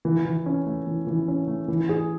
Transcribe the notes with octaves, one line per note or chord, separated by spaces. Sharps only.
E3
E3
C#4
A3
E3
E3
C#4
A3
E3
G#4